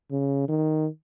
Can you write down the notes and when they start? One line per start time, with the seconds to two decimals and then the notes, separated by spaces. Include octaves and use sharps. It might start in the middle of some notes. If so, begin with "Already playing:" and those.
0.11 C#3
0.49 D#3